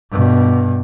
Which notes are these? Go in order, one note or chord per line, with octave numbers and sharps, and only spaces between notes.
G2 B2